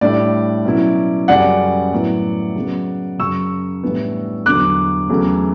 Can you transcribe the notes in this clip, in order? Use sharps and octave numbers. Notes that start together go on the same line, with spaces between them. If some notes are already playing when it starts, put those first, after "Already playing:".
A2 G3 D4 D5
B2 F#3 C#4 E4
F#2 C#3 G3 C#4 D5 F#5
A2 F#3 B3 E4
C#3 F#3 B3
F#2 C#3 F#3 C#6 E6
A2 E3 G3 B3 D4
E2 D3 F#3 D6 F#6
E2 C#3 F#3 A3